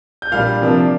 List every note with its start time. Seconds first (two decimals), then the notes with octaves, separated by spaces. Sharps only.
0.22 G6
0.32 A#2 G3 D4 F5 F6
0.61 C3 F3 A#3 D4